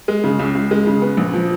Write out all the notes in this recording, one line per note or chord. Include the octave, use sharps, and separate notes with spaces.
G#3
C#3
C#2
C#2
G#3
C#3
B3
A#1
F3